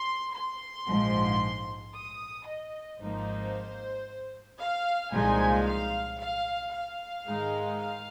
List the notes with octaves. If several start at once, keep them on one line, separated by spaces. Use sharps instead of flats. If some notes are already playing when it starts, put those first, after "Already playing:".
Already playing: C6
C6
A#1 G#2 F3
D#6
D#5
G#1 G#2 F3 A#3 D#4 C5
F5
C2 A#2 F3 G#3 D#4 G#5
F5
F5
F5
G#2 D#3 G#3 D#4
F5